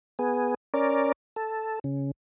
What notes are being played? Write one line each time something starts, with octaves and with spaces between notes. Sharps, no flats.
B3 G#4
C#4 A#4 D5
A4
C#3